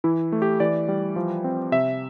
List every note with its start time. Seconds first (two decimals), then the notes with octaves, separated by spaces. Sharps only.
0.04 E3 E4
0.32 A3
0.42 G4
0.60 E3 D5
0.88 G3
1.16 F3
1.44 C4
1.72 C3 E5